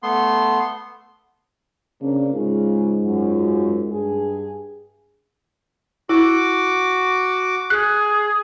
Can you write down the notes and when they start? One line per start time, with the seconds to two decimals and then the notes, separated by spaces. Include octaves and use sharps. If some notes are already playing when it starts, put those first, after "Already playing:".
0.03 A3 B3 C6
2.01 C#3 A#3 C4 D4
2.34 G#2 C#3 G#3 F4
3.02 F#2 F4
3.90 G2 G#4
6.09 E4 F#4 D6
7.70 G#4 F#6